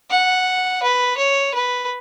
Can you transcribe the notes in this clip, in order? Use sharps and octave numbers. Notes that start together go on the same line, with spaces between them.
F#5
B4
C#5
B4